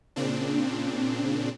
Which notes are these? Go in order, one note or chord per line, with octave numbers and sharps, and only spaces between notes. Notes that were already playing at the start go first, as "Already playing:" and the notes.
A#2 C#3 C4 D4